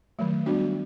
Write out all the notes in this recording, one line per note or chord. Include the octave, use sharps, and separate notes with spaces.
D#3 F#3 A3
G3 B3 D4 F#4